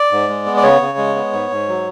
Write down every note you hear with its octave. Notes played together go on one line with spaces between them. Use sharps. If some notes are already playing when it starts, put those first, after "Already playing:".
Already playing: D5
G#2
G#3
B3
D5
C#3 C#5
C#3
G#3
B3
G#2
G#2
F#3